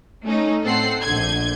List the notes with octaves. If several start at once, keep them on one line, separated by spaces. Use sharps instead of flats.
A3 C#4 D#4
A2 C4 A4 F#5 C7
A#1 D3 G6 G#6